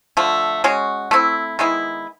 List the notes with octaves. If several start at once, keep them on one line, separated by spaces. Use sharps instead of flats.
D3 F3 A3
G#3 C#4 F#4
A3 C4 E4
D#3 G#3 B3 E4